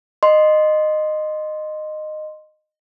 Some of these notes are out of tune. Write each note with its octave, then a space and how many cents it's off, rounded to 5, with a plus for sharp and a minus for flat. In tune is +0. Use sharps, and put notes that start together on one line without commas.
D#5 -15 C6 +0